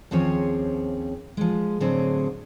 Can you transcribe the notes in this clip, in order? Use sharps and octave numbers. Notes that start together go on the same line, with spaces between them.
D#2 F3 C4 C#4 G#4 C#5
F3 G#3
A2 D3 F#3 C4 G#4